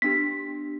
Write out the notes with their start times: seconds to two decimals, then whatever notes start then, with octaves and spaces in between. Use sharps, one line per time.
0.02 B3 D4 G4 B6